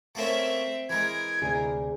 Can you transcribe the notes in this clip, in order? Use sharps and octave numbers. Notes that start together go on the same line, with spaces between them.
A3 A#3 C4 C#4 E5
E3 G#3 A#4 G#6
D2 C3 G#4